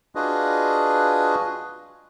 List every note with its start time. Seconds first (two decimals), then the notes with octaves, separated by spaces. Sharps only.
0.15 D4 F4 F#4 G#4 B4 D#5